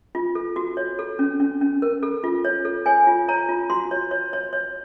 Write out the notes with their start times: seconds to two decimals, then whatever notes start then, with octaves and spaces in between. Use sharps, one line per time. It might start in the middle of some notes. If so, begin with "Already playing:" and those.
0.15 F4
0.35 A4
0.56 F#4
0.77 C#5
0.99 A4
1.19 C#4
1.40 C#4
1.61 C#4
1.82 A#4
2.03 A4
2.24 F4
2.45 C#5
2.65 A4
2.86 C#5 G#5
3.07 F4
3.28 C#5 A#5
3.49 F4
3.70 F#4 C6
3.91 C#5
4.11 C#5
4.33 C#5
4.53 C#5